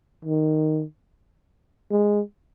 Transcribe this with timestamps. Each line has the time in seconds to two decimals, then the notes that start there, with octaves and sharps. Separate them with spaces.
0.25 D#3
1.91 G#3